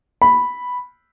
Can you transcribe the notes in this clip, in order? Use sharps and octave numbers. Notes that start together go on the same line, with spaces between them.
B5